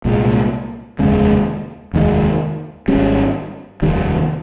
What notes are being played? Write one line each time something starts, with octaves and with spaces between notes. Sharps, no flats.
C2 A#2 G#3
F1 D#2 C#3 G#3
F1 D#2 D#3 G#3
G#1 G#2 G3 C#4
F1 D#2 D#3 G3